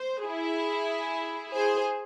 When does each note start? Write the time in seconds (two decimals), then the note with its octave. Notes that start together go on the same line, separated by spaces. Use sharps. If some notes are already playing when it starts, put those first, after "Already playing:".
Already playing: C5
0.25 E4 G#4
1.51 G#4 C5